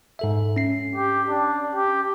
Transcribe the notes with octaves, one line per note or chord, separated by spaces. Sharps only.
G#2 A4 E5
C#4 C7
G4
D4
G4